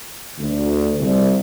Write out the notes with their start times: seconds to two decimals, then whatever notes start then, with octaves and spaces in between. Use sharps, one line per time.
0.38 D2
1.00 C2